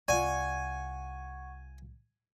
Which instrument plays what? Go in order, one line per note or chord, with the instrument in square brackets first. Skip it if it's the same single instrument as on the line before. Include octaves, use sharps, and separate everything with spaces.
[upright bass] C2 [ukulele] F4 D5 [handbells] F#5 C#6 [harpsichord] G#5